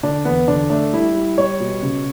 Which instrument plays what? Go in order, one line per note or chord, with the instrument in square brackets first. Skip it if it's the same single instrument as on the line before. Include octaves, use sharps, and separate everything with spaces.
[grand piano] D3 D4
E2 B3
D3 D4
A3 D4
G3 E4
G3
G3 C#5
B2
C#3